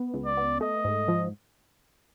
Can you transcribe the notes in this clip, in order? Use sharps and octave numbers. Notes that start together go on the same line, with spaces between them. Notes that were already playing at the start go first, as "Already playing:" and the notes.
Already playing: B3
C#2
D5
B3
A3 D#5
G#2
F3